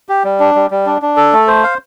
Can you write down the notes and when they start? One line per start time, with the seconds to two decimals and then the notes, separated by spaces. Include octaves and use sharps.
0.09 G4
0.24 G3
0.40 D4
0.55 G3
0.71 G3
0.86 D4
1.02 D4
1.17 A4
1.33 A3
1.48 C5
1.63 F5